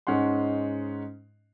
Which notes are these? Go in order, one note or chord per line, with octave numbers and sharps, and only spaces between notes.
G#2 G#3 C#4 D#4 F#5 C6